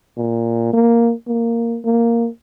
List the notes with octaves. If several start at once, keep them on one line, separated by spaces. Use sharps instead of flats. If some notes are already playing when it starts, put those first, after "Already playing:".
A#2
A#3
A#3
A#3